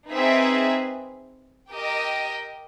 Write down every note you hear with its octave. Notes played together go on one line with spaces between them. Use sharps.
C4 D#4 G#4 B4 E5
G4 A#4 D#5 G5